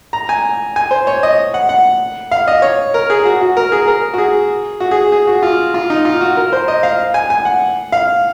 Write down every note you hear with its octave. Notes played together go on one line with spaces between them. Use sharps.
A#5
G#5
G#5
C5
C#5
D#5
F#5
F#5
F5
D#5
C#5
A#4
G#4
F#4
F#4
A#4
G#4
A#4
F#4
G#4
F#4
G#4
G#4
F#4
F4
F4
D#4
F4
F#4
A#4
C5
D#5
F5
G#5
G#5
F#5
F5